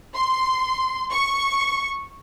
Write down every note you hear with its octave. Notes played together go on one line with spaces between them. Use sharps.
C6
C#6